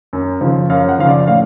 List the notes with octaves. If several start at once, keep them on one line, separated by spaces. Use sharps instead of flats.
F#2
C#3 F3
F#2 F5
F#5
C#3 F3 F5
D5
A2 F5